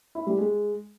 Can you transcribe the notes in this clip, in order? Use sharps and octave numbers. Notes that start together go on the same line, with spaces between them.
E4
G3
G#3